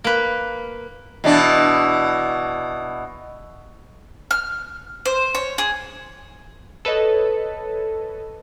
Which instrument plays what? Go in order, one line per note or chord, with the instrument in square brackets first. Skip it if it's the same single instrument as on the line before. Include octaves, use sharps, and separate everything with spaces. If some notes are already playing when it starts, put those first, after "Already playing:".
[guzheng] A#3 B4
[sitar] B2 E3 D4
[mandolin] F6
C5
C#5
G#4
[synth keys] A4 B4 C#5 D#5 A5